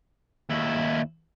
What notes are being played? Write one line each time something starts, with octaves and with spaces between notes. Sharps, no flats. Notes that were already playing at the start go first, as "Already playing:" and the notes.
D#2 E4